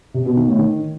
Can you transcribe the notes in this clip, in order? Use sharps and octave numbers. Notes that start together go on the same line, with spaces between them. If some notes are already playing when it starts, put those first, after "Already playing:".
C3
B2
D#3
A2
D#3